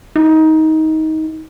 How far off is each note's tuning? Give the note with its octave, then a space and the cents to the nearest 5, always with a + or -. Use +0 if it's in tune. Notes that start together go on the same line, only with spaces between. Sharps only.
D#4 +20